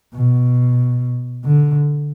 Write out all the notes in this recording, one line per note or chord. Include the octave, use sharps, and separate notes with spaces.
B2
D3